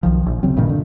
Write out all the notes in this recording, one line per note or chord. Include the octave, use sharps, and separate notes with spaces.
B1 D#3 F3
A#1
D2 C#3 F#3 C4
G2 A#2 D3 D#3
D3